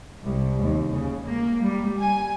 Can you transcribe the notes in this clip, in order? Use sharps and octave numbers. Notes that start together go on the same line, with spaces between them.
C2
D#2
C#3
A#3
G3
G#5